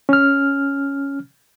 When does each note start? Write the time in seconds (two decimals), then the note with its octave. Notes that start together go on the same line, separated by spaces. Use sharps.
0.09 C#4 F6